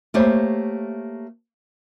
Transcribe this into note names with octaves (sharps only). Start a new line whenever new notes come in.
A3 A#3 G4 C5 C#5